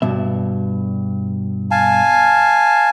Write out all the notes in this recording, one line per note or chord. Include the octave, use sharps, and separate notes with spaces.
G2 B2 E5
F5 G#5 A5